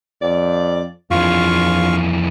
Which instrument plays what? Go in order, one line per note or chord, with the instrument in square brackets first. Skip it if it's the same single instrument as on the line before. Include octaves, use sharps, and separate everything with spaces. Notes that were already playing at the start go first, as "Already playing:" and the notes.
[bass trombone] F2 [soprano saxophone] D5
[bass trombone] A#1 [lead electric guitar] F2 E3 [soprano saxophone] F4 [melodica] F5 C#6